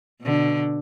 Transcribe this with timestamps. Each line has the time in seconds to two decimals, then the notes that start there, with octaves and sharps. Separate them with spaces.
0.21 B2 D3